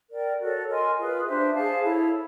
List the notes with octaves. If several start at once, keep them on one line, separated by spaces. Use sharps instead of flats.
A#4 D5 G5
F#4 A4 C#5
A#4 D#5 G#5 C6
F4 G#4 B4
D4 G4 C5 E5
G#4 C5 F5 A5
E4 A4 C#5